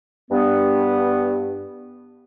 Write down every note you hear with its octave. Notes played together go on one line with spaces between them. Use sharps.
G2 B3